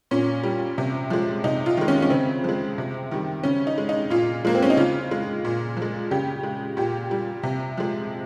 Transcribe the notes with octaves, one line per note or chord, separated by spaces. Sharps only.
A#2 C#4
G3
C3
F3 G#3
C3 D#4
F4
D#3 G#3
C#4
C#4
C#3 C4
F3 G#3
C3
D#3 G3
C#3 C#4
D#4
G#3
D#4
A#2 F4
F3 G#3 A#3
C4
C#4
D#4
C#3 F4
G#3
A#2
F3
G#3
C#3 G4
G#3
A#2 G4
G3
C3
F3 G#3